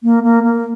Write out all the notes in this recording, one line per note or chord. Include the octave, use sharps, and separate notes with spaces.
A#3
A#3
A#3